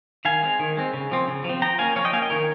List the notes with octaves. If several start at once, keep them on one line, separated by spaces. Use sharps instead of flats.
D#3 F5 G#5
G#3 C4
D#3
G#3 C4
C#3
F3 C4
C#3
F3 C4
F3 G5 A#5
A#3 C#4 F5 G#5
F3 C#5 F5
D#5 G5
A#3 C#4 F5 G#5
D#5 G5
D#3 A#4 C#5